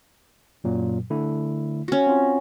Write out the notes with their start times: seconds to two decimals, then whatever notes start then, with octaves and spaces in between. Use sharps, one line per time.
0.64 F#2 A#2 F#3
1.10 D3 A3 E4
1.88 C#4 F#4
2.07 C4 F4